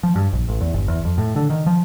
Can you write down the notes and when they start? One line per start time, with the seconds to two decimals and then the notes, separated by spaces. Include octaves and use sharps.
0.03 F3
0.16 G2
0.33 A#1
0.48 A1
0.61 E2
0.73 G1
0.88 E2
1.05 F2
1.18 A2
1.36 D3
1.50 D#3
1.66 F3